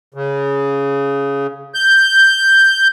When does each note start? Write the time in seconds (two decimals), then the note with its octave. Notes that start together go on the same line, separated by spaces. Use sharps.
0.14 C#3
1.74 G6